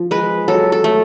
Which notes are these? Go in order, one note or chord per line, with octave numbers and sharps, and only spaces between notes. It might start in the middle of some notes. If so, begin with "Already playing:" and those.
Already playing: F3
G#3 B4
F#3 A4
A4
A3